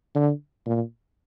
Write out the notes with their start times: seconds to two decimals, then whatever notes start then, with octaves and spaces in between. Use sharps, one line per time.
0.15 D3
0.66 A#2